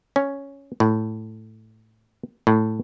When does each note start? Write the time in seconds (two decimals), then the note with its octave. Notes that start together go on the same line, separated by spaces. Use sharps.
0.16 C#4
0.80 A2
2.47 A2